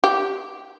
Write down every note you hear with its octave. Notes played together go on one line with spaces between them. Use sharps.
G4